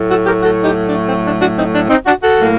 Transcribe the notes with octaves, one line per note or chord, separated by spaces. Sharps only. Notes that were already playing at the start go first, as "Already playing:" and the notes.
Already playing: A2 F#3 A3
F#4 A4
G4 A#4
F#4 A4
D#4 G4
D4
C4
D4
D4 F#4
C4 D#4
D4
C4 D#4
D4 F#4
F#4 A4
A2 F#3 A#3